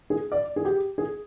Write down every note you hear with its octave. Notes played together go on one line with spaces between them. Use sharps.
G#4
D5
G#4
G4
G#4